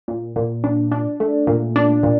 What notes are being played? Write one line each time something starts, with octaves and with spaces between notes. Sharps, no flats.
A#2
A#2
D4
D4
A3
A#2
D4
A#2